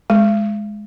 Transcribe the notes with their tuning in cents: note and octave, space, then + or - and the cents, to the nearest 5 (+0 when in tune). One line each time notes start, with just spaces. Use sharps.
G#3 +5